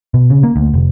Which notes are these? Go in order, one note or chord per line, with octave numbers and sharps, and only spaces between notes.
B2
C#3
A#3
D2
F1